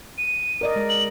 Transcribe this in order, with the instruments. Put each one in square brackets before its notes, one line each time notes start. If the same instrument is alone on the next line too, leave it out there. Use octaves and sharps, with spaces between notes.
[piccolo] D#7
[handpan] A#4 D5 D#5
G#3 A#4
[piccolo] F#7